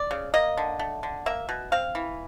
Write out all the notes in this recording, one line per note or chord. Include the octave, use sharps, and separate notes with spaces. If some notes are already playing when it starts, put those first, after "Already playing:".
Already playing: D5
C#3
A#3 D#5
D3
A3
D3
A#3 E5
B2
C4 F5
E3